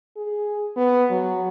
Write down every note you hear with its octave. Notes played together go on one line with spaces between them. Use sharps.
G#4
B3
F#3